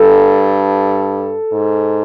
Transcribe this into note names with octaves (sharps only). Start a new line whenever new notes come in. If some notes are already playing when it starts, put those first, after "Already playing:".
Already playing: G2 A4
G#2